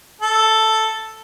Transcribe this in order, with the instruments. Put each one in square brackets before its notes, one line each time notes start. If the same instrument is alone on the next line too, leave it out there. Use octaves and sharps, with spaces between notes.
[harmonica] A4